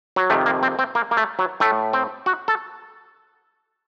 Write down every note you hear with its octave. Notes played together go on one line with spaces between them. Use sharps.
F#3
F2 C3 D#3 A3
A#3
C4
C4
A#3
A#3
A3
F#3
A2 A3
C4
F#4
A4